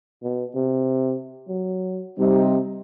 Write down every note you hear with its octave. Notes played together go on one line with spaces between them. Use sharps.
B2
C3
F#3
C3 G3 C4 D#4